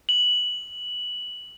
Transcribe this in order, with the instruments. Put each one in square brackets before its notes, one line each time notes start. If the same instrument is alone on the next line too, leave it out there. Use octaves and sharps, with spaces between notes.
[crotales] F#7